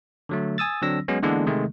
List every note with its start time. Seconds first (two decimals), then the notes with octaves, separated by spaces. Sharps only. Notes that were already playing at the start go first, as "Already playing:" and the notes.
0.29 D3 F#3 A3
0.58 G#5 D#6 E6 A6
0.82 D3 F#3 C4 D4 E6 A#6
1.08 F#3 G#3 B3 C#4
1.23 D3 E3 G#3 A#3 B3 D4
1.46 C3 D#3 G#3 A3